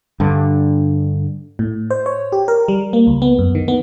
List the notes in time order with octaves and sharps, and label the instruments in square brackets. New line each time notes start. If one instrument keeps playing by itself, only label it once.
[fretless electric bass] G2 D3
[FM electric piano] A2
C5
C#5
G4
A#4
G3
A#3
C#2
B3
F#2
D#3
B3